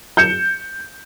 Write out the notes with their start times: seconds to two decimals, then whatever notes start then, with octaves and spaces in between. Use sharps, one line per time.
0.17 G6 C#7 E7